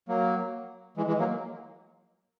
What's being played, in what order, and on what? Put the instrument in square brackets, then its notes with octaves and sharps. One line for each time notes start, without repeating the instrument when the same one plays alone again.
[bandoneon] F#3 A#3
E3 G#3
E3 G#3
F#3 A#3